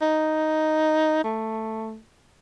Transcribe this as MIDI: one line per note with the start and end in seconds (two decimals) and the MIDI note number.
0.02 1.19 63
1.24 1.98 57